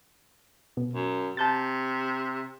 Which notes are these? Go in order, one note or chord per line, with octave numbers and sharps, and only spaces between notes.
B2
F#2
C3 A5 G6 A6